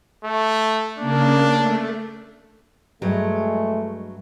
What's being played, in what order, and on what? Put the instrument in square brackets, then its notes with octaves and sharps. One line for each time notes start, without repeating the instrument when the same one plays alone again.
[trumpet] A3
[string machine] C#3 A#3 [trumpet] D4
[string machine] A3
[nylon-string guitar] G2 F#3 [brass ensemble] G#3 A3